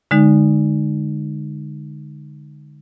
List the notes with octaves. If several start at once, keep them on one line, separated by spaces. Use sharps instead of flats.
D3 G#3 D#4